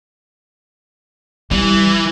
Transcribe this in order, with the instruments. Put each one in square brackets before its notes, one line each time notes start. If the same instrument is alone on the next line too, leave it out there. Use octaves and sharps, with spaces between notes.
[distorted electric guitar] E3 [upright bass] G3